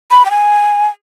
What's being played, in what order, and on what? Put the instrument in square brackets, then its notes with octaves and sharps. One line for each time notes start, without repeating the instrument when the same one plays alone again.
[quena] B5
G5
G#5